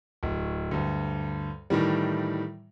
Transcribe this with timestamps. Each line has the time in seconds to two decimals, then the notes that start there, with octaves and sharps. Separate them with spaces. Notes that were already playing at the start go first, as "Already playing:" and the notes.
0.23 D1
0.71 D2 G2
1.70 A2 D#3 E3 G3